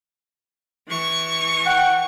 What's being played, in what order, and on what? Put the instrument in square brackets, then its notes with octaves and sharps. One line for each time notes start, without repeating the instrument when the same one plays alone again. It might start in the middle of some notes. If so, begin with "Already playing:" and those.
[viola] E3 C#6
[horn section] F#5 G5